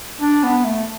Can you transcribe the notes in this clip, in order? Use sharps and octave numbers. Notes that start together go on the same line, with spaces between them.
D4
B3
A3